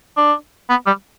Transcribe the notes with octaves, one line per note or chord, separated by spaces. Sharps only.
D4
B3
G3